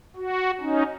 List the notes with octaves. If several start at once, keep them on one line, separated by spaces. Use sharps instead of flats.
F#4
C#4 D#4